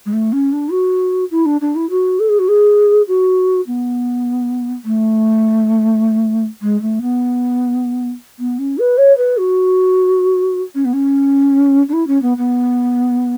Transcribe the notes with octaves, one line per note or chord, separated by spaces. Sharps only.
G#3
A3
C#4
D4
F#4
E4
D4
D4
E4
F#4
A4
G#4
F#4
G#4
F#4
B3
A3
G#3
A3
B3
B3
C#4
B4
C#5
B4
F#4
C#4
B3
C#4
D4
E4
C#4
B3
B3